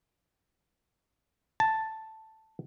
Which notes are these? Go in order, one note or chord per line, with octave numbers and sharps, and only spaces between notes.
A5